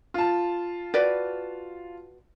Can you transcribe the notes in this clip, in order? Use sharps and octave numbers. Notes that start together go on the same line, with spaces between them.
F4 A5
F#4 B4 D5